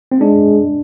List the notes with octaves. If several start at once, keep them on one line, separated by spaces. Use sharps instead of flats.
C4
G#3 D4